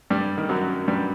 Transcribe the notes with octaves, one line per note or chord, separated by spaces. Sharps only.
G2 G3
D#3
F#2 F#3
G2 G3